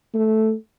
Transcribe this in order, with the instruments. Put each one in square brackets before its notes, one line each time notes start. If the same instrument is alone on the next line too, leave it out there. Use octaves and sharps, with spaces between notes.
[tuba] A3